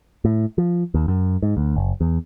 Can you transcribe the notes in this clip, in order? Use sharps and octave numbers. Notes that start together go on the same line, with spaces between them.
A2
F3
D#2
F#2
G#2
D2
F#1
E2